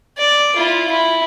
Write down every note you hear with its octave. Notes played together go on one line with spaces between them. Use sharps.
D5
E4 F4
E4